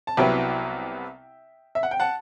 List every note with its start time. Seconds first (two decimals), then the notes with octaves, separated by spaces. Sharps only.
0.07 A5
0.17 C2 C3 F#3 B3 E4 E5 G5
1.75 E5
1.83 F#5
1.91 G5
2.00 F#5 A5